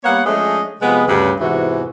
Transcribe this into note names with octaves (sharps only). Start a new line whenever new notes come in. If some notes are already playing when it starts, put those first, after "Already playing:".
G3 A#3 B3 C#5 F#5
F3 G#3 A3 C#4 D4 D#5
C3 F3 G#3 B3
D2 G2 C#3
E2 G#2 C3 E3 F#4